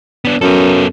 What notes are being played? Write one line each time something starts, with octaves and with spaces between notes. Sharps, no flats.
B3 D4
F#2 B3 A4